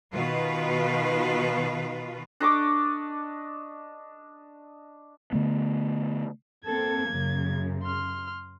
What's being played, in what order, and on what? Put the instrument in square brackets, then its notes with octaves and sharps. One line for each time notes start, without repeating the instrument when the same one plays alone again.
[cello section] B2 D#3 F4 B4
[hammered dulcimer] D4 D#5 C#6 D6
[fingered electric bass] D3 A3 B3
[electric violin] A#3 G#6 [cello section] C4 A4
[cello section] F#2 C#3
[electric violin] C6 F6